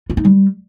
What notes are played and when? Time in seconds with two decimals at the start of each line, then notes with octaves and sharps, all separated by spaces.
0.10 F4
0.17 D#4
0.25 G3